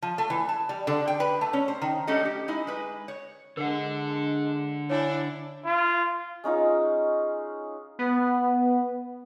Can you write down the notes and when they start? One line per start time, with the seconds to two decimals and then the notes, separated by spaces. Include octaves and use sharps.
0.02 F3
0.18 A3
0.30 E3
0.49 A5
0.69 G3
0.87 D3
1.08 G5
1.20 B4
1.41 A3
1.53 C#4
1.68 C5
1.82 D#3
2.07 G3 A3 C#4 D4 A4 D#5
2.25 G4
2.48 G#3 D#4 E4
2.67 G#3 B4
3.08 C#5
3.57 D3 G#3 D4 A#4 F#5
4.90 D4 E4 C#5 G#5
5.65 F4
6.44 G#3 C#4 D#4 F4
7.99 B3